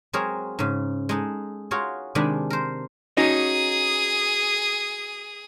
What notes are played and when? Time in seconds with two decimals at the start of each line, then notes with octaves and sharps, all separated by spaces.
0.13 F#3 G#3 C4 G#4 A#4 C#5
0.59 G#2 C#3
1.09 G#3 D#4 A4
1.71 F4 F#4 G#4 A#4 C#5
2.15 C3 D#3 G#3 D4 G#5 B5
2.50 A#4 C5
3.17 C#4 D#4 F#4 G#4 D#6